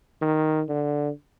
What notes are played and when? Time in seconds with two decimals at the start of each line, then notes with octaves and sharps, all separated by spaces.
0.22 D#3
0.69 D3